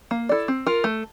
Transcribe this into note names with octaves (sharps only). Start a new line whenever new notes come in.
A#3
E4 A4 D5
C4
F4 A#4
A3